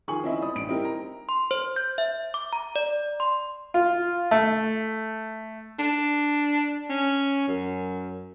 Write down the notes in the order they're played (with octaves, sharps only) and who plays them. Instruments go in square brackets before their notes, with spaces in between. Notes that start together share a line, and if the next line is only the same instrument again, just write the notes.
[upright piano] D#3 F3 G#4 G#5 C#6 F#7
C4 C#4 E4 D#5 E5
D5 B5 D#6
A1 D4 D7
C4 D#4 E4 G4 A#4
A#5
[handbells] C6
C5
G6
E5
D6
A#5
D5
C6
[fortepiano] F4
A3
[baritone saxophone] D4
C#4
F#2